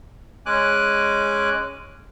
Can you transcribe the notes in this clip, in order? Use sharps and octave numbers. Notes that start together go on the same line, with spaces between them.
G#3 C#4 G#5 D6 F#6